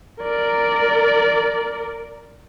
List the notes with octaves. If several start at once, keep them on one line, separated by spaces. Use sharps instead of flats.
A#4 D5